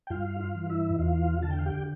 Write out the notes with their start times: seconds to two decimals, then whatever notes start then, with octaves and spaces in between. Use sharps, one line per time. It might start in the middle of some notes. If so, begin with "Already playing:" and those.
0.07 G5
0.10 G2 F4 F5
0.40 F4 F5
0.55 E3
0.70 E4 E5
0.99 E2 F4 F5
1.42 D3 A5
1.51 G5
1.59 F5
1.66 G4 G5